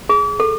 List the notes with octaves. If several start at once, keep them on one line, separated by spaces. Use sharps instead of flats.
G#4
A4